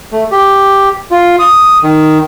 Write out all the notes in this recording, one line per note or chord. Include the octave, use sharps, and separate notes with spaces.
A3
G4
F4
D#6
D#3